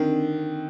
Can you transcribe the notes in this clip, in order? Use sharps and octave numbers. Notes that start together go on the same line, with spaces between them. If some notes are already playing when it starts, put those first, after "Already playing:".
Already playing: D3 D#3 C4 D4